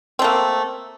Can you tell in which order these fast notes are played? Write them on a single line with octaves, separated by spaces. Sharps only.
C4 A3 A#3